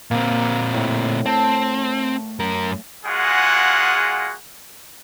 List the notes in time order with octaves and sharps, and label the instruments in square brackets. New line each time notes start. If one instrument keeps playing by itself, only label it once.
[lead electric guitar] A#2 C4 [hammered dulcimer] A#3
[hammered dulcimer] A2
[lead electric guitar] C4 [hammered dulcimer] A5
[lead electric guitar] F#2 A#4
[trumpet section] G#3 A#3 F4 F#4 G#4 F#5